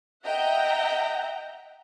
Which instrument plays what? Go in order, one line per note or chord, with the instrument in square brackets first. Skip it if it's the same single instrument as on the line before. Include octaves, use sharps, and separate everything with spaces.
[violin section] D#5 E5 F#5 G5 A#5